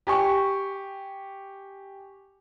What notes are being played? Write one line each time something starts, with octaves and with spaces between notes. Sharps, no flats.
G4 G#5 C#6